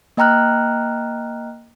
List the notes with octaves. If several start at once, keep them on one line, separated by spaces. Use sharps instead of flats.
A#3 D#5 G5 A#5 F6 F#6